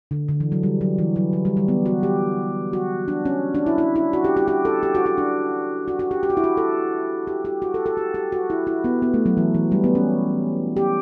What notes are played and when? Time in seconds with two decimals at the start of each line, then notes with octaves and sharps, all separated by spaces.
0.11 D3
0.28 D3
0.40 E3
0.52 F#3
0.63 G3
0.81 F#3
0.98 E3
1.16 F#3
1.33 F#3
1.45 G3
1.57 G3
1.68 B3
1.86 F#4
2.03 G4
2.73 F#4
3.08 D4
3.25 C#4
3.55 D4
3.66 E4
3.78 E4
3.96 E4
4.13 F#4
4.24 G4
4.37 G4
4.48 G4
4.65 A4
4.83 G4
4.95 F#4
5.06 F#4
5.18 D4
5.88 F#4
5.99 F#4
6.11 G4
6.23 G4
6.30 F#4
6.37 E4
6.44 F#4
6.57 A4
7.27 G4
7.45 G4
7.62 F#4
7.74 A4
7.86 A4
7.97 G4
8.14 G4
8.32 F#4
8.50 E4
8.67 E4
8.84 B3
9.02 B3
9.14 A3
9.26 F#3
9.37 E3
9.54 E3
9.72 G3
9.84 B3
9.95 C#4
10.77 G4